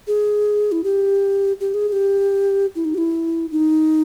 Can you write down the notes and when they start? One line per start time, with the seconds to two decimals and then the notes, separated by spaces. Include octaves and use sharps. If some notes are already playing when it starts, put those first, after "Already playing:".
0.07 G#4
0.72 E4
0.84 G4
1.60 G4
1.74 G#4
1.88 G#4
1.92 G4
2.75 E4
2.85 D#4
2.95 G4
2.98 E4
3.52 D#4